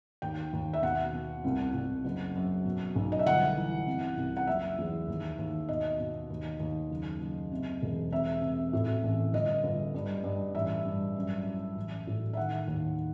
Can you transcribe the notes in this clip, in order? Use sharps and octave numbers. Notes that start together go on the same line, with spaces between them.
D#2 G5
D#2
E5
B2 F#5
B2
C2
C2
F#1
F#2
B2
B1
D#5
E5
G1 F#5
E3
C3
C2
F#5
F#1 E5
E2
D#2
D#2
B2 D#5
B2
D#2
D#2
F#1
F#1
C3
E1
C3 E5
C3
A2
A1
G1 D#5
G1
G2
G2
A1 E5
G2
F#2
F#2
A1
A2
E5
D#3 F#5
D#2